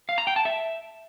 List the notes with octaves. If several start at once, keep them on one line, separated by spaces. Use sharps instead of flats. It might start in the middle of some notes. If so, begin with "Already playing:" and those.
F5
A#5
G5
A5
E5